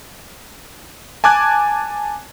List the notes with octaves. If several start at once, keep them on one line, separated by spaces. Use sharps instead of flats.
G#5 A5 D6 F#6 G#6